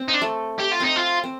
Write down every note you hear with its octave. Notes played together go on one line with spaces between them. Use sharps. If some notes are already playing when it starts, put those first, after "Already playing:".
Already playing: C4
D#4
D4
A3
G4
F4
C4 D#4
F4
C4